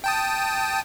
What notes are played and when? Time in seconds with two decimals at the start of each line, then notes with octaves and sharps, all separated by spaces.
0.04 G5 A5 D#6